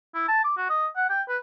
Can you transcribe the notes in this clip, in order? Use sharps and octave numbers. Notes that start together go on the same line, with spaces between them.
E4
A5
D6
F#4
D#5
F#5
G5
B4